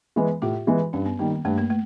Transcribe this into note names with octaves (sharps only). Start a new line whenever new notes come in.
E3 G#3 B3
A2 F4 G4
E3 G#3 B3
G2 C#4
B3
D#3 G3 A#3
G2 A3
A#3
A3